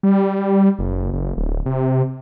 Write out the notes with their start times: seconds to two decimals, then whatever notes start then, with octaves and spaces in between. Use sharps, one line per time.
0.03 G3
0.79 F#1
1.13 F#1
1.37 D1
1.66 C3